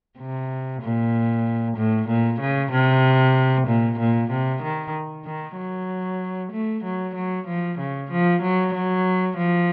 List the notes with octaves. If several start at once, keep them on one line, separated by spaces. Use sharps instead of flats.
C3
A#2
A2
A#2
C#3
C3
A#2
A#2
C3
D#3
D#3
F#3
A3
F#3
F#3
F3
C#3
F3
F#3
F#3
F3